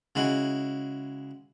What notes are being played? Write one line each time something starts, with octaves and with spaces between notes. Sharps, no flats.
C#3 G#3 E4 F#4